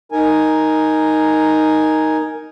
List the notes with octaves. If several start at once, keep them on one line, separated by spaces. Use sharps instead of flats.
D#4 A#4 G#5